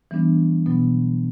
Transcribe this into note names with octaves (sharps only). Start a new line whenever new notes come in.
E3 G3 B3 D4
B2 F#3 B3